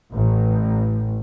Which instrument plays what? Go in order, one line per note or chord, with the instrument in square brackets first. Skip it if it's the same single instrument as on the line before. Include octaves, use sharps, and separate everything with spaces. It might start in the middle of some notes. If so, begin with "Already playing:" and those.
[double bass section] A1